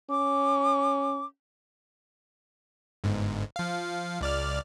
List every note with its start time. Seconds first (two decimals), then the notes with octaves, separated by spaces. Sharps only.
0.10 C#4 D6
3.04 G1 G#2
3.56 F3 F5
4.21 C#2 D5 F6